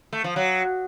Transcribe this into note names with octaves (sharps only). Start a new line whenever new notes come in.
A3
F3
F#3